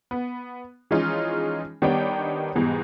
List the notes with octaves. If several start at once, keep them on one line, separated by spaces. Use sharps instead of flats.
B3
E3 F3 G#3 C#4 D#4 F4
D#3 G3 B3 D4 C#5 G5
G#2 B2 E3 G3